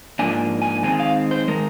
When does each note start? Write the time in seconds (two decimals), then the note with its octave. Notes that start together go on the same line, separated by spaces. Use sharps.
0.19 G#2 F3 A#3 D4 G#5
0.62 G#5
0.83 D#3 G#3 C4 G#5
1.00 F5
1.31 C5
1.48 D#3 G#3 A#4